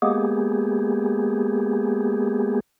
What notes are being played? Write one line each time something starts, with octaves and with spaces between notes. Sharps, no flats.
G#3 A#3 B3 G4 G#4